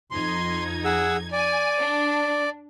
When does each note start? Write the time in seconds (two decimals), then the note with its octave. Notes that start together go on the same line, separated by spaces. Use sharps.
0.11 F2 D#4 C6 G#6
0.85 G#4 F#5 E6
1.32 D5 G#5
1.79 D4